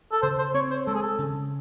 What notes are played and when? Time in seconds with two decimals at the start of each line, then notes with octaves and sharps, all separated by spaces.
0.12 A4
0.22 C#3 C5
0.38 C5
0.54 C4 C#5
0.70 C5
0.86 G#3 A4
0.95 G#4
1.02 A4
1.19 C#3